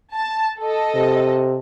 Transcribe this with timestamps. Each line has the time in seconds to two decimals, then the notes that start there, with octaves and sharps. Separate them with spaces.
0.13 A5
0.61 A4 D#5
0.95 C3